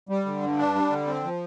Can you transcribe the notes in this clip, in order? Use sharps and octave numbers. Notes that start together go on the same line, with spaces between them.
G3
D3
G2
D4
G3
D3
C4
F3